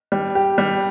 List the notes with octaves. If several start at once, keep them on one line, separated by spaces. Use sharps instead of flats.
G3
G4
G3